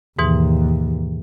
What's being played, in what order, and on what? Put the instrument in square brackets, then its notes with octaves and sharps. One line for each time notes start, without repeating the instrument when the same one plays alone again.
[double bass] D#2 [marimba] G#2 B2 E3